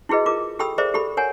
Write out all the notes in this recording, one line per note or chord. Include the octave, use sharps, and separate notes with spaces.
E4 F#4 G#4 B4 D#5
F4 A#4 D6
G4 A4 G5 B5 D#6 E6
G#4 A#4 C5 D5 E5
G4 A4 B5
A#4 C#5 F#5 G#5